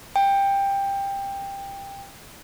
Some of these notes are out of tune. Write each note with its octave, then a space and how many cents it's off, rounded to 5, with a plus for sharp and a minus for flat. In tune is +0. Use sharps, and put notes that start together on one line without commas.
G5 +15